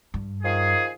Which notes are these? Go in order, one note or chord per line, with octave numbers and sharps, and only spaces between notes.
G2
D#3 F3 G#4